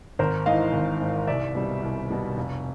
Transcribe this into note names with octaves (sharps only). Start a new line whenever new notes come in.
G#1 A#4 C5
G#2 E3 D#5 F5
G#1
G#2 E3
C2 D5 E5
B2 G3
C2
B2 G3
F1